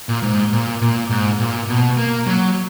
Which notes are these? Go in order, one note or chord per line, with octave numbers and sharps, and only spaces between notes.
A#2
G#2
A#2
A#2
G#2
A#2
B2
A#3
F#3